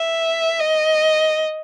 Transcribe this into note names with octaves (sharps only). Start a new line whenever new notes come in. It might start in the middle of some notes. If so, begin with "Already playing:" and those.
Already playing: E5
D#5